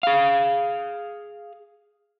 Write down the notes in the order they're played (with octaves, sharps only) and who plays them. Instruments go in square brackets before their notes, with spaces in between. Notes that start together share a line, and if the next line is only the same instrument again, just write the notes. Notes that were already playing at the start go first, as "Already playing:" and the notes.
[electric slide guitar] G#4 F5